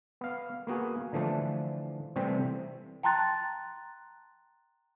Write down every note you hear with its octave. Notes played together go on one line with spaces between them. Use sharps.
B3 F5
A#3 B3 F#4 G#4
D3 E3 F3 A3 D4
C3 E3 G3 A3 C4
G5 A5 A#5 C6 F#6 A6